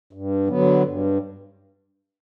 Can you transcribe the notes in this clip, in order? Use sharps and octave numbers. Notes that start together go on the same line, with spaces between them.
G2
D3 F#3 B3
G2